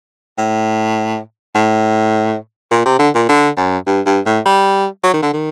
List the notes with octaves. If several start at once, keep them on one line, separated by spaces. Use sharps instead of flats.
A2
A2
A#2
C3
D3
A#2
D3
F#2
G2
G2
A2
G3
F#3
D#3
D3
D#3